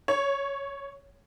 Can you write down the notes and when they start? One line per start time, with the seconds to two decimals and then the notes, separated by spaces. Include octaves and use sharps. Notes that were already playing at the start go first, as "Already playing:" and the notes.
0.08 C#5